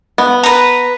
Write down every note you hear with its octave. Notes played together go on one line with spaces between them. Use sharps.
B3
B4 A#5